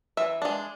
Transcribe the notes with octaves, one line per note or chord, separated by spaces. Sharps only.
E3 E5
G#3 D4